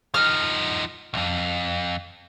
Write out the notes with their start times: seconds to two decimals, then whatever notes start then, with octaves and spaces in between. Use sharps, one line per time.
0.14 F3 D#4 F6
1.14 B1 F2